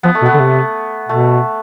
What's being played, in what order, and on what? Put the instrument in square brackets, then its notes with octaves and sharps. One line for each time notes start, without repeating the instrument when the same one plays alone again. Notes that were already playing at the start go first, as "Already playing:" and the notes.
[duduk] F3 [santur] B3
[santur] A3
[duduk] B2
[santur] B3
[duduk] D3
C3
[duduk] B2 [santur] A3